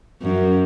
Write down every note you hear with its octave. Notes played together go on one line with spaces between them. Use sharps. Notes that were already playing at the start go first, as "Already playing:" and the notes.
F#2